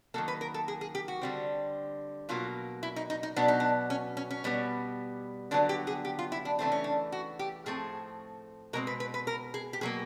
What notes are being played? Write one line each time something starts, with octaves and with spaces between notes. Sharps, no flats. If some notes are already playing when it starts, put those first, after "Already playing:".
D#3 F#3 A#3 A4
B4
A#4
A4
G#4
G#4
G4
F#4
D3 G3 C4
B2 F#3 A#3 F4
E4
D#4
D#4
D#4
B2 F#3 B3 D4
D#4
D4
C#4
C#4
C#4
B2 G3 B3
D3 F#3 B3 D4
G4
G#4
G4
F4
E4
D4
C#3 E3 A3 C4 D4
C#4
D4
F#4
G4
A2 F3 A3 C4 G#4
B2 G#3 C4 A#4
B4
B4
B4
A#4
G#4
G4
B2 F#3 A#3 G#4